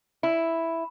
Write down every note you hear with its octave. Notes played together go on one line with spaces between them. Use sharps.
E4